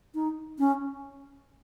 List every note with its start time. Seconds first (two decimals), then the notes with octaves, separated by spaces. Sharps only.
0.15 D#4
0.59 C#4